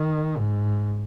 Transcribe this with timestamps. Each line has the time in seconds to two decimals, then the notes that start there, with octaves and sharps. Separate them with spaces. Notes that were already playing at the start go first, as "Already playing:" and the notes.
Already playing: D#3
0.38 G#2